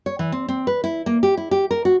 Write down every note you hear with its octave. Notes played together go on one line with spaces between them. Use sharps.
C#5
E3
C4
C4
B4
E4
A#3
G4
E4
G4
A#4
F#4